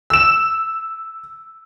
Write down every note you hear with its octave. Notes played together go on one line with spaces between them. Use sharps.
E6 E7